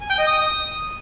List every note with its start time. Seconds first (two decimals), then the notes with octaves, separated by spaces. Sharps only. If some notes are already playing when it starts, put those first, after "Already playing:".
0.01 G#5
0.10 G5
0.18 D#5
0.27 D#6